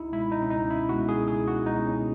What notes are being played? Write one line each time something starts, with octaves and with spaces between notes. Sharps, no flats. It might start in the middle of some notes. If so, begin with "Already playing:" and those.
Already playing: C#2 D#4 E4
B2 G#3 E4
D#4
C#4
C#2 D#4
E4
B2 G#3 F#4
G#4
C#2 G#4
F#4
B2 G#3 D#4
C#4